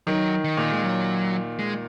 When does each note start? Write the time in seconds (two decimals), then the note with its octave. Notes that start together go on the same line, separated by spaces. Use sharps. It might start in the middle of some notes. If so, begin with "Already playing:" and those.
0.07 D#3 F#3
0.44 D#3
0.57 A#2
0.72 G#3
0.83 F#3
1.59 G#3